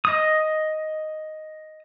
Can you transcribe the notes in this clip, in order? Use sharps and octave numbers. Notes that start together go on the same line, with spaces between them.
D#5 D#6